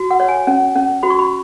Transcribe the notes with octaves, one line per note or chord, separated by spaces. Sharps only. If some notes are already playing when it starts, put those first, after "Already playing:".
Already playing: F#4
F#5
C#5
G#5
C#4
C#4
F#4 B5
C#6
B5